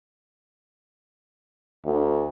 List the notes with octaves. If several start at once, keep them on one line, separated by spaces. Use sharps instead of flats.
D2